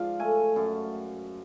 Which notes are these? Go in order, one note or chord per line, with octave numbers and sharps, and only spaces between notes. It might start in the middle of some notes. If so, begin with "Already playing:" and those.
Already playing: G#2 F3 D5 F5
A3 G#5
F#2 A5